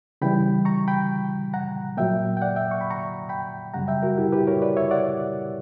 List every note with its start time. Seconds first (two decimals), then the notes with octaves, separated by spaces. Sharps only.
0.22 C#3 E3 G3 G5 B5
0.65 A#5 C#6
0.88 G5 B5
1.54 F#5 A#5
1.97 A#2 F#3 A#3 E5 G5
2.37 G5
2.42 D5 F#5
2.56 E5 G5
2.71 C#6
2.81 B5
2.91 A#5 C#6
3.29 G5 B5
3.74 F#2 C#3 G3 F#5 A#5
3.88 E5 G5
4.03 F#4 A#4
4.18 E4 G4
4.32 G4 B4
4.47 A#4 C#5
4.62 B4 D5
4.77 C#5 E5
4.91 D5 F#5